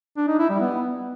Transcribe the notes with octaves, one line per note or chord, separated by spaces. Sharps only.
D4
D#4
E4
G3
B3